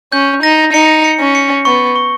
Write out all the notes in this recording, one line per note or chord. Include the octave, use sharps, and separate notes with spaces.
C#4 G6
D#4 A#6
D#4 C#7
C#7
C#4
C#7
B3 C#6
C#6